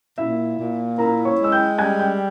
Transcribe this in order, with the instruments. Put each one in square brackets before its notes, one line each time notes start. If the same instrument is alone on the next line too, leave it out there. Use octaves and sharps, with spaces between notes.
[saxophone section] A#2 [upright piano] E4 E5
[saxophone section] A#2
[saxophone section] E4 [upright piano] A#4 A#5
[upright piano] C#5 C#6
[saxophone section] G#3 [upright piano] E6
[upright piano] G5 G6
[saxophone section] G3 [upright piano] G#5 G#6
[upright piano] G5 G6